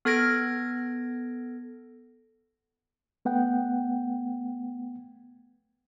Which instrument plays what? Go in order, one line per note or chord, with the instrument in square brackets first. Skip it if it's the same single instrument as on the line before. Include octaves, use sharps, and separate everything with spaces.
[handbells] B3 A4 F6 G#6 A#6 D7
[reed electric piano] A3 B3 F#5 G5